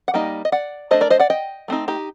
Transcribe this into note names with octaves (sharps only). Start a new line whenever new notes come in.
F#5
G3 A#3 D#4 D#5 G5
D#5
D5 F#5
A3 D4 C5 D#5
A#4 D5
C5 D#5
D5 F#5
D#5 G5
A3 C4 D#4
D#4 G4